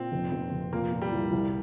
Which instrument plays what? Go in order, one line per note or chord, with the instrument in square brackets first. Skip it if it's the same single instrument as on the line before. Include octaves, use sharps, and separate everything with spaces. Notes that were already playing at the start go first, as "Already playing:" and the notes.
Already playing: [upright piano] A#2 [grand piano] C4
[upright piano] F1
F1
F1
[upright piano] A#2 [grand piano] A#3
[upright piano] A#2
[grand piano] G3
[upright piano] C2
C2